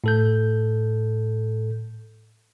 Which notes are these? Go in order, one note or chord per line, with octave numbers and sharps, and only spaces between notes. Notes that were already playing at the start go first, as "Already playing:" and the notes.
A2 A4 G6